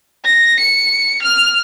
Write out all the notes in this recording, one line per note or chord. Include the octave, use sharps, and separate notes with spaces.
A#6
C#7
F6